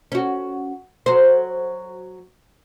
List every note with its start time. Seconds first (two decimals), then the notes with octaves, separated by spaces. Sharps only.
0.12 C#4 F#4
1.06 F#3 C5